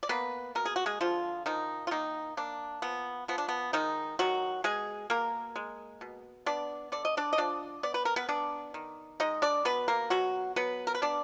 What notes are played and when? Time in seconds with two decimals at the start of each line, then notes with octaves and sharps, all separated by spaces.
0.03 D5
0.09 A#3 B3 B4
0.55 B2 A#4
0.65 G#4
0.76 F#4
0.86 G#3 G#4
1.01 D3 F3 F4
1.46 D#3 F3 D#4
1.87 F4
1.91 D#3 A#3 D#4
2.37 A#3 D4
2.82 F3 B3
3.28 F3 B3
3.38 D4
3.48 B3
3.73 D#3 G#3 D#4
4.19 D#3 F#3 F#4
4.64 B2 G#3 G#4
5.10 B2 A#3 A#4
5.56 G#3
6.01 B2
6.46 B3 D4 D5
6.92 D3 D5
7.05 D#5
7.17 D4 D5
7.33 D#5
7.38 F3 D4 D5
7.83 B3 D5
7.94 B4
8.05 A#4
8.16 B3 B4
8.29 B3 D4 D5
8.74 D#3
9.20 G#3 D#4 D#5
9.42 D4 D5
9.65 B2 B3 B4
9.88 A#3 A#4
10.10 B2 F#3 F#4
10.56 F#3 B3 B4
10.87 A#4
10.95 B4
11.02 B3 D4 D5